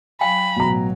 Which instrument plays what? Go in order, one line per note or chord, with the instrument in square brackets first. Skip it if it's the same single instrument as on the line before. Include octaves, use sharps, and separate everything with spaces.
[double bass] F#3 [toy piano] F5 G5 G#5 [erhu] B5
[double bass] A1 F#3 [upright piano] B2 A#5